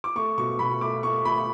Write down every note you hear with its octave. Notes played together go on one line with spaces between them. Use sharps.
D6
A3 C#6
B2 C#6
B2 B5
A3 D6
A3 C#6
A3 B5